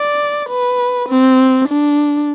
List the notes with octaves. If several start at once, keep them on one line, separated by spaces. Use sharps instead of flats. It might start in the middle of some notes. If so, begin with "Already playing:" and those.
Already playing: D5
B4
C4
D4